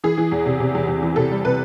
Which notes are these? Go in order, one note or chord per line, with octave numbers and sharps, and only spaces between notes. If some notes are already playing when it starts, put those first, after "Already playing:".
E3 G#4
E3
E2
C3
C3
E2
E2
E3
C3 A4
G3
C3 B4